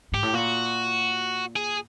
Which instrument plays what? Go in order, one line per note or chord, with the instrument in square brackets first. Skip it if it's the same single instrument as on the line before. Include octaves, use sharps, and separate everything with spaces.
[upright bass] G#2 [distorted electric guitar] G4
[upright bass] A2
[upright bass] A#2 [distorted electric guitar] F#4
[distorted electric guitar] G#4